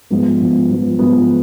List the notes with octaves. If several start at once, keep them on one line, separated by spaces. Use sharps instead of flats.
G#2 F3 B3
G#2 F3 B3
G#2 F3 B3
G#2 F3 B3